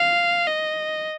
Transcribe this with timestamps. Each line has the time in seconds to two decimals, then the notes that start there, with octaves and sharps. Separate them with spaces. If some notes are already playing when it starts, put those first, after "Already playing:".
Already playing: F5
0.47 D#5